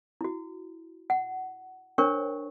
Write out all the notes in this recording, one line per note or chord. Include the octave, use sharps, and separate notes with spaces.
E4 F#4
F#5
D4 A#4 C5 C#5 G5 C#6